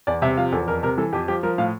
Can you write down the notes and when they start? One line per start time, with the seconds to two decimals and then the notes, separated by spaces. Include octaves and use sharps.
0.07 E2 D5
0.22 C3 E5
0.37 F3 F5
0.52 E2 A4
0.67 F2 A#4
0.83 C3 A#4
0.97 E3 A4
1.13 F2 G4
1.28 F3 G4
1.43 F3 A#4
1.58 A2 F5